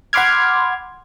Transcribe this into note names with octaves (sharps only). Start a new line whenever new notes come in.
F#5 B5 C6 D6 F6 G#6